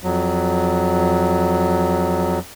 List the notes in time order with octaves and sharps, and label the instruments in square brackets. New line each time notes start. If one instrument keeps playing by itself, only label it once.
[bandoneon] F2 F#3